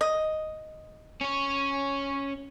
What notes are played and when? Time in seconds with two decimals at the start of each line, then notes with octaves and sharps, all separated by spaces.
0.01 D#5
1.21 C#4 C#5